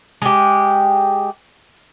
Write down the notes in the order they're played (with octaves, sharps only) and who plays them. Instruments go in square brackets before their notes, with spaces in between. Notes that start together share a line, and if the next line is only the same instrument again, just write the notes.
[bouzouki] G#3 G4